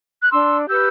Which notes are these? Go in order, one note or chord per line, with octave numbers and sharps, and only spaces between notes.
F#6
D4 C6 E6
G4 B4 E6 G6